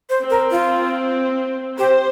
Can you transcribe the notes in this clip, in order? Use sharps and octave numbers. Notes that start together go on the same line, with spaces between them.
C5
C4
A#4
F4
G4 C5